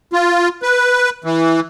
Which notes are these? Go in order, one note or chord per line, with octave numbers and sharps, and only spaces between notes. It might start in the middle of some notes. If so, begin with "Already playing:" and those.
F4
B4
E3